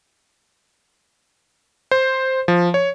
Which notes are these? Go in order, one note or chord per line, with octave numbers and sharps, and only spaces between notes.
C5
F3
C#5